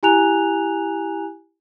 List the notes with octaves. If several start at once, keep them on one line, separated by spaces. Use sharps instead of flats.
E4 G4 G#5 A#5 F#6 F7